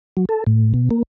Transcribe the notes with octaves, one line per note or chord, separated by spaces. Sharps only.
F#3
A4
A2
B2
A#3